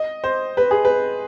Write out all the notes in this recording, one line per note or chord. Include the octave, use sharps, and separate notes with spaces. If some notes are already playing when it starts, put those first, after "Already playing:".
Already playing: D#5
C5
B4
G#4
B4